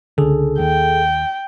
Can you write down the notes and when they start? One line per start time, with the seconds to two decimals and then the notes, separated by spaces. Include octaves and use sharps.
0.18 C#2 D3 G#4 A4
0.59 D#2 G5